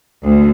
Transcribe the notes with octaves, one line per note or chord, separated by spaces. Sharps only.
D2